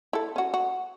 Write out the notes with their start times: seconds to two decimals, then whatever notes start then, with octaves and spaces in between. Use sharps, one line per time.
0.13 E4 A4
0.36 C#4 F#4
0.54 F#4